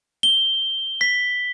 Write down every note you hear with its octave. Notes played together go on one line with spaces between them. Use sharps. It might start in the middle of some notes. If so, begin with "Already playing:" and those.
G7
B6